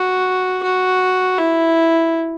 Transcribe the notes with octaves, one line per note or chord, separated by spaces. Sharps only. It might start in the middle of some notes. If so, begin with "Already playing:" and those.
Already playing: F#4
F#4
E4